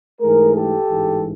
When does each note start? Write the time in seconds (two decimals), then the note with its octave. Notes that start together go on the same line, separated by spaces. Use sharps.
0.21 G#2 E3 A3 G#4 A#4
0.54 G4 A4
0.88 A1 G#2 E3 G#3